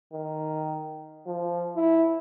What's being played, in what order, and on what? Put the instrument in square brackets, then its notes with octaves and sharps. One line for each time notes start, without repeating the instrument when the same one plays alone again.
[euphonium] D#3
F3
E4